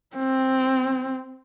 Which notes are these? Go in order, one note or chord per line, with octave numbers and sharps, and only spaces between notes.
C4